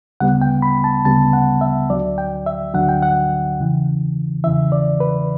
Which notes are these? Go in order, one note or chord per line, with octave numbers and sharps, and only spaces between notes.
D2 C#3 G3 B3 F#5
G5
B5
A5
D2 C#3 G3 B3 A5
F#5
E5
D2 D3 F#3 D5
G5
E5
D2 D3 F#3 F#5
G5
F#5
E2 C#3 E3
E2 C#3 E3 E5
D5
B4